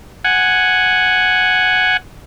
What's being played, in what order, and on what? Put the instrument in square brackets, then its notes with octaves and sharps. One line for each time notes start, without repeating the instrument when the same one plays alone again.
[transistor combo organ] F#5 G#5